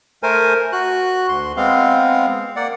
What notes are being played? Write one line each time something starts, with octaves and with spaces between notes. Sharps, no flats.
A3 A#4 C5 G#5
F#4 F#6
D2 C6
G#3 B3 C4 F5
A#3 D5 F#5